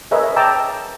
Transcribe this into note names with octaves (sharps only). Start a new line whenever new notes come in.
G#4 A#4 B4 C#5 D#5 E5
G5 A5 A#5 D6 E6